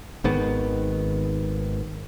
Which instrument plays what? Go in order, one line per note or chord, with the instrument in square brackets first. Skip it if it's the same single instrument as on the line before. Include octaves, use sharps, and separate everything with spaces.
[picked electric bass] G#1 G#2 D#3 B3